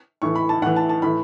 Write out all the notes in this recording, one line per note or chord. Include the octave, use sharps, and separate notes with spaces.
A2 E3 C#6
B5
A5
A2 E3 F#5
A5
A5
A2 E3 B5